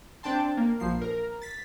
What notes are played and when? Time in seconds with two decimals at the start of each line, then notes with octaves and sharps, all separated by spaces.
0.23 C4 D4 G5 A5 C6
0.57 A#3
0.80 A#1 F3 C7
1.02 A#4
1.42 A6 B6